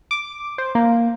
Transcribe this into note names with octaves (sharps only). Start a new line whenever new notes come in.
D6
C5
A#3